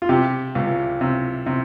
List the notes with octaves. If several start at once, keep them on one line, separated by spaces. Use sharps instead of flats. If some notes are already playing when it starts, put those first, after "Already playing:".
F4
C3 G4
C#2
C3
C3